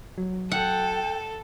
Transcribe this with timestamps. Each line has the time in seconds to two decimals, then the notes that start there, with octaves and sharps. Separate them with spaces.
0.18 F#3
0.52 A4 F#5 G5